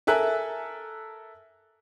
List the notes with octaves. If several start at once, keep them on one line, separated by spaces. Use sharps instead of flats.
A4 A#4 E5 G#5 F#6